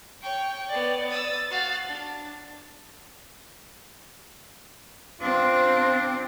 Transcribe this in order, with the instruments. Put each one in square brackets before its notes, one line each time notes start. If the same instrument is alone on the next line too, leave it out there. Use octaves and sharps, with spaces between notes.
[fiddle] C#5 C#6 [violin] G5
[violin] B3 D5
[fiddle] D#6 E6 [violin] A6
[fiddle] F#4 F5
D4
[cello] C4 [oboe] D4 [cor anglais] F4